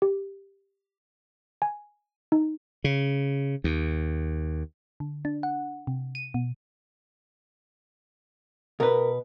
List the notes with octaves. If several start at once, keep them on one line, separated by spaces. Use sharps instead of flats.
G4
G#5
D#4
C#3
D#2
D3
D4
F#5
C3
D#7
B2
B2 A#4 B4